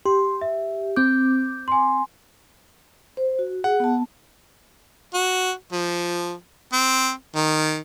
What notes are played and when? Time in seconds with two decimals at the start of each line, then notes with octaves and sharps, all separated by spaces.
0.06 G4 C6
0.41 E5
0.96 C4 D6 G6
1.68 G#5 C6
3.17 C5
3.39 F#4
3.64 G#4 F#5
3.80 B3 A5
5.14 F#4
5.72 F3
6.73 C4
7.35 D#3